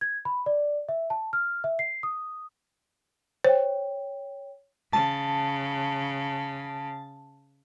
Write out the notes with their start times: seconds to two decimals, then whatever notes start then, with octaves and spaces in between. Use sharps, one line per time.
0.01 G#6
0.25 B5
0.46 D5
0.89 E5
1.10 A5
1.33 F6
1.64 E5
1.79 C7
2.03 D#6
3.45 C5 C#5 G5
4.93 C#3 A5